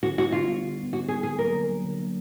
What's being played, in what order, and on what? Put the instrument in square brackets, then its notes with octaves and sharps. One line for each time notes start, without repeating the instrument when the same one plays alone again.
[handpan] D3 [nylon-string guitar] F#4
[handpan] G3 [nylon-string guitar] F#4
[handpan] B3
[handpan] D3 [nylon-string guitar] F4
[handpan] G3 B3
D3
G3 B3
[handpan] D3 [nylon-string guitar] F#4
[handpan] G3 B3 [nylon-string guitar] G#4
[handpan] D3 [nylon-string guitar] G#4
[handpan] F#3 A#3 [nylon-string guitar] A#4
[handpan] D3
F#3 A#3
D3
F#3 A#3